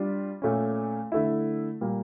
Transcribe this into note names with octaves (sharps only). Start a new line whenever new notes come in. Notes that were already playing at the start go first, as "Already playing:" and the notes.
Already playing: G3 D4 F4
A#2 A3 C#4
D3 A3 E4
A#2 G3 A#3